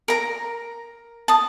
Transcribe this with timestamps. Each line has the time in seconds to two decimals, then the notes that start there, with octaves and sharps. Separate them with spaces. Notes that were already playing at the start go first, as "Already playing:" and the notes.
0.08 A#4 A#5
1.28 A5 D#6